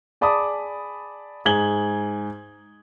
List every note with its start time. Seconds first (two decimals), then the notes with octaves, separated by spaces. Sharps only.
0.21 G#4 D5 A5 B5 D6 D#6
1.46 G#2 G#4 G#6 F#7 G7